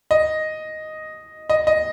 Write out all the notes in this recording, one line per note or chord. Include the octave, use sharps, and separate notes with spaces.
D#5
D#5
D#5